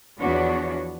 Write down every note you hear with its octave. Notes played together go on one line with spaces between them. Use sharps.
E2 F3 B3 D4 F#4 C#5